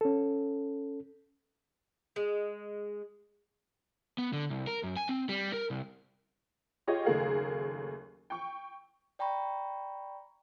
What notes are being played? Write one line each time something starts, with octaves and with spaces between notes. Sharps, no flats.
C#4 A4
G#3
B3
D3
C2
A#4
F#2
G#5
C4
G3
A#4
C2
F4 G4 G#4 C#5 D#5
F#1 D#2 A3 G#4 A#4 F5
G5 C#6
D5 G5 A#5 B5 C#6